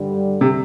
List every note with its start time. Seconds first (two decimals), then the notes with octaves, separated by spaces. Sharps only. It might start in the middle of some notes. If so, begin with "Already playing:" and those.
Already playing: G2 D3 G3
0.41 C3